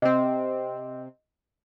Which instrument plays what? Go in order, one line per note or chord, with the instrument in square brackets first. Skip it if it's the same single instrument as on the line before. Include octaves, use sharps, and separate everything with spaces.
[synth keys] C3 C4 [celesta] D#5